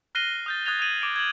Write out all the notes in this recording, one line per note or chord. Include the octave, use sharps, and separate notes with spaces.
F6 F#6 A#6 C7 D#7 G7
D#6 G6 A6
D#6 F#6 G#6 A6 F7 G7
D#6 G#6 D#7 F#7
D6 G#6 D7
G#6 F#7